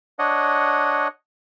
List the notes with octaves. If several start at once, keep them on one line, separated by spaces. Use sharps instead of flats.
D4 C#5 D#5 F#5